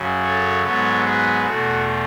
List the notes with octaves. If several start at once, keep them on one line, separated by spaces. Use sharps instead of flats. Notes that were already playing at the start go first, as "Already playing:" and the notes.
Already playing: F#2 C#3 F#3
A4 C#5
G#2 F#3 B3 A4 C#5
G#4 B4
E2 B2 A3 F#4 A4